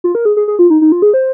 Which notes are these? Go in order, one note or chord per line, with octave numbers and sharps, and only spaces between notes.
F4
A#4
G#4
G#4
G#4
F4
D#4
D#4
F4
G#4
C5